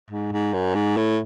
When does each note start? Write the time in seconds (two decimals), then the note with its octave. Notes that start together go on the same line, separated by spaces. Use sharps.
0.11 G#2
0.32 G#2
0.54 F#2
0.75 G#2
0.97 A2